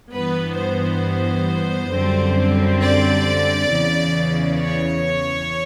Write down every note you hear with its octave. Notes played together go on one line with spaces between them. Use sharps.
G2 E3 G3 B3 B4
C5
F#2 D3 G3 C4
D5
E2 C#3 E3
C#5